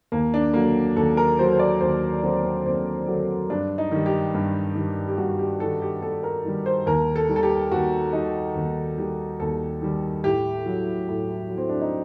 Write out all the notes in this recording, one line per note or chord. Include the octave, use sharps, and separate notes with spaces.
D#2 A#3
D4
D3 F#3 A#3
D#2 A4
A#4
D3 F#3 C5
C5
D5
D#2 C5
D3 F#3 C4
C4
D#2 C4
D3 F#3
G2 D4
D#4
D#3 G3
G4
G2
D#3 G3
G4
G2 F#4
G4
D#3 G3 A4
G4
G2 A4
A#4
D#3 G3
C5
D#2 A#4
A4
D#3 G3
A4
G4
D#2 F#4
D#3 G3 D#4
D#2
D#3 G3 G4
D#2 A4
D#3 G3
A2 G4
F#3
A2
F#3
C4
D4
D#4